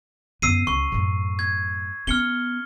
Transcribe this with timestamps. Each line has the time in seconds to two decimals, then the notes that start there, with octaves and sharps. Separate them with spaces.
0.42 F#2 B3 E6 C7 D#7
0.67 C#2 C#6
0.92 F#2 A2
1.39 G#6
2.07 B3 C#4 F6 C#7 G7